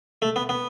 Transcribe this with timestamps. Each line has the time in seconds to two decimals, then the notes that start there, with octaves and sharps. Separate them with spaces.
0.22 A3
0.36 B3
0.49 B3